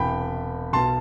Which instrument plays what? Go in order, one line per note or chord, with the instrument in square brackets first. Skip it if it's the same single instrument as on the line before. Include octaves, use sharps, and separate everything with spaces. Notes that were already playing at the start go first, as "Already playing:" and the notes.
Already playing: [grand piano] E1 E2 C3 E3 G5 B5
B1 B2 A5 C6